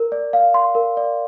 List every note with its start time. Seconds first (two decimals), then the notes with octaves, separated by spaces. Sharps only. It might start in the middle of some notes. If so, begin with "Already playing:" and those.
Already playing: A#4
0.12 D5
0.33 F5
0.54 C6
0.75 A#4
0.97 D5